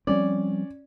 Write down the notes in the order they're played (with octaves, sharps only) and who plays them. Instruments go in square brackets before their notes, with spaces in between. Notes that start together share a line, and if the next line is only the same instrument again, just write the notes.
[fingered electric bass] F3 G3 C4 [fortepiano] C#4 D5